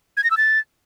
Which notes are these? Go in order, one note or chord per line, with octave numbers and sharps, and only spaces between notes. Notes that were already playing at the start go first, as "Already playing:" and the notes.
G#6
A#6
E6
A6